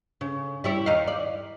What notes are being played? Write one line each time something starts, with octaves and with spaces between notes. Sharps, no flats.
C#3
G3 E4 C#5
D#2 D#4 F5
D5